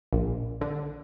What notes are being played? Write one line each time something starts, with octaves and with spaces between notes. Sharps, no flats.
A#1
D3